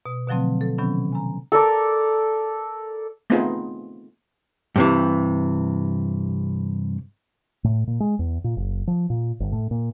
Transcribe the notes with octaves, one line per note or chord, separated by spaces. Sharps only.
B2
B2 D3 F3 F#3 A3 C4
A4
C3 D#3 F#3 B3 C#4
G#5 A#5
A4 A#4 D5
A3 B3 C4 D#4 F4 G#4
G2 C3 E3
A2
A#2
G#3
E2
A#2
F#1
F3
A#2
G1
A2
A#2